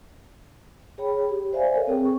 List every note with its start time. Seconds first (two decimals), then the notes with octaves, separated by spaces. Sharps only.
0.98 G#4 C#5 G5 B5
1.29 G4
1.53 C5 D5 E5 F5 G#5
1.74 A4 A#4 C#5
1.87 C4 G#4 G5
2.05 C#6